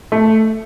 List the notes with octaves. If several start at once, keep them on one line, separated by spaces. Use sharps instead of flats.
A3